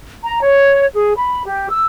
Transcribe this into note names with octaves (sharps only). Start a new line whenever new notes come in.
A#5
C#5
G#4
B5
G4
E6